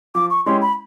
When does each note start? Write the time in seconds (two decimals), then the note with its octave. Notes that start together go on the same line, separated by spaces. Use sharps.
0.15 F3 D6
0.30 C#6
0.46 G#3 C#4 E4 G4 C6
0.62 B5